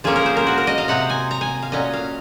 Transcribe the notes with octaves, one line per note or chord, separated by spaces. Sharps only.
F3 A#3 C#4 G#4
A#4
C5
A#4
F#4
A#4
D#5
F5
C3 F#3 C4 F#5
G#5
A#5
G#5
F5
A#2 F#3 C#4 D#5
F5